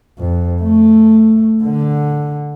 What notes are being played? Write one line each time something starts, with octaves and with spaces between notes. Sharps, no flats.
F2
A3
D3